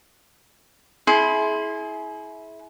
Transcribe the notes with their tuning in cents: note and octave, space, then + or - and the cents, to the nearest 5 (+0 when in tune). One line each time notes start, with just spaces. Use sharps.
E4 -15 G#4 +30 C6 +0